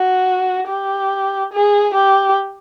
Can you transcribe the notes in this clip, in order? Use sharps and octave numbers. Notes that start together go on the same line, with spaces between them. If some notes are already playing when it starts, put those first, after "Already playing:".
Already playing: F#4
G4
G#4
G4